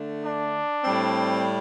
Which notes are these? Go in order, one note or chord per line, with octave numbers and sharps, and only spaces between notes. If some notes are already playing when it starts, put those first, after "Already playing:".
Already playing: D3 A3
D4
A2 G3 C4